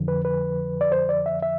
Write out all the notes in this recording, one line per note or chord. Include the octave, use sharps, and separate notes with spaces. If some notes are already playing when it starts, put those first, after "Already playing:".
Already playing: F2 D3 F3
B4
B4
D5
C5
D5
E5
E5